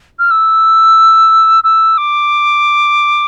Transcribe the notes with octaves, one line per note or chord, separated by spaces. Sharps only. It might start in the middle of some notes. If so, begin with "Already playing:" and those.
F6
E6
E6
D6